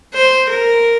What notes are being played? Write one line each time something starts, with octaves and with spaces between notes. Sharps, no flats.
C5
A#4